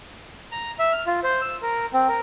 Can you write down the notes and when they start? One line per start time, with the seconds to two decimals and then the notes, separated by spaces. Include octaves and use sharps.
0.52 A#5
0.79 E5
0.93 F6
1.07 F4
1.24 C5
1.41 E6
1.62 A#4
1.94 C4
2.08 A#4